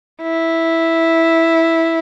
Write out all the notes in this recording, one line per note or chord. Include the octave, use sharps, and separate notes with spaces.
E4